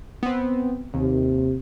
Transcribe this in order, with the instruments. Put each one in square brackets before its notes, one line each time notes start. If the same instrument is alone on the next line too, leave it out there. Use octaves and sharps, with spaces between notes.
[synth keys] B3 C4
[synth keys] D#2 [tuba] C3